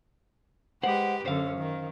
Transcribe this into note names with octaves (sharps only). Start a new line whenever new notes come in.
G#3 G4 B4 C5 F#5
F#2 D3 C#4 C5 F5
D#3